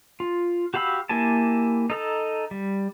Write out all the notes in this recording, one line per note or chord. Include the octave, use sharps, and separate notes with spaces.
F4
F#4 G4 F5 B5 E6
A#3 E4 G4 G#5 A5
D#4 A4 A#5
G3